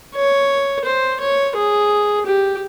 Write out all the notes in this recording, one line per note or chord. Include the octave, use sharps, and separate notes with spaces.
C#5
C5
C#5
G#4
G4